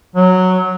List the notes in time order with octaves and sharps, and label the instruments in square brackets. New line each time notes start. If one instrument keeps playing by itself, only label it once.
[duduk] F#3